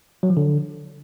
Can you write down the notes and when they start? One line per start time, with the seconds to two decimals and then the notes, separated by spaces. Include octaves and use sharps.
0.23 F#3
0.30 F3
0.37 D3